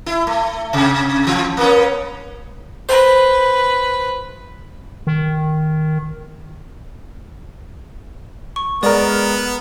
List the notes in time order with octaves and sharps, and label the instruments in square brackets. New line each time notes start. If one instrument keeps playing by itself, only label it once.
[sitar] E4
A3
C3
E3
A#3 B3 C#4
[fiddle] B4 [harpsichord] C5
[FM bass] D#3
[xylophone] C#6
[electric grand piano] G#3 A#4 [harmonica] B3 [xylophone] D5